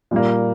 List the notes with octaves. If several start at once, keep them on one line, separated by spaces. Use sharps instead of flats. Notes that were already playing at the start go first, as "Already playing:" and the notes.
A#2 G3 A#3